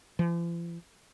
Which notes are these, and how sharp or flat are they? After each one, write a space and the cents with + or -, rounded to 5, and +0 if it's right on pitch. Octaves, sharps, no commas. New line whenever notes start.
F3 -45